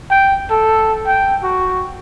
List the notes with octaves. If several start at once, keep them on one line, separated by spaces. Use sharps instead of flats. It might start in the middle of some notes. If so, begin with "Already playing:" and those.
G5
A4
G5
F#4